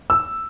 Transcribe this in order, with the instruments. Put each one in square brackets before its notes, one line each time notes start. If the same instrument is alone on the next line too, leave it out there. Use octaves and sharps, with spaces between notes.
[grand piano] E6